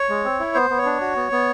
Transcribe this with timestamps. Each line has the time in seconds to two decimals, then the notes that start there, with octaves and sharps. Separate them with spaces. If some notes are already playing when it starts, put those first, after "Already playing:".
Already playing: C#5
0.09 G#3
0.25 C4
0.40 E4
0.54 B3 C5
0.70 B3
0.78 C#5
0.86 D4
1.01 F#4
1.16 B3
1.32 B3